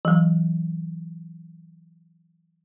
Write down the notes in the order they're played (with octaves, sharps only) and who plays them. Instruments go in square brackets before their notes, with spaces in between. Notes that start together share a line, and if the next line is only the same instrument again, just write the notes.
[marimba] E3 F#3